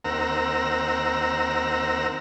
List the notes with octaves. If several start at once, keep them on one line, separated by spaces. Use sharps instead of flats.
D#2 C4 A#4 F#5 A#5 E6